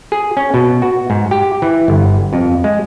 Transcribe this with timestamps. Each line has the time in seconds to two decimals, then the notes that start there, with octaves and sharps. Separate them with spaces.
0.12 G#4
0.37 C#4
0.54 B2
0.82 F#4
1.10 G#2
1.31 G4
1.62 E3
1.88 G1
2.33 F2
2.64 G#3